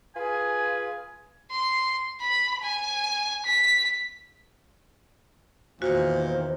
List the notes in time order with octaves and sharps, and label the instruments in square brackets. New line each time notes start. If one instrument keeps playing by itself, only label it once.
[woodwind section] F4 G#4 B4 G#5
[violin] C6
B5
G#5
B6
[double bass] E2 D#3 [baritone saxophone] A#2 [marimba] F#4 [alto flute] C5